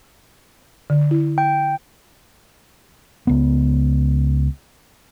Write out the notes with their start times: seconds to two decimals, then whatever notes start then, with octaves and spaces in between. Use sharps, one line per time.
0.90 D3
1.11 E4
1.38 G5
3.27 C#2 B3